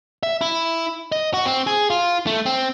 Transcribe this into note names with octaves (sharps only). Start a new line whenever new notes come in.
E5
E4
D#5
F#4
C4
G#4
F4
A3
C4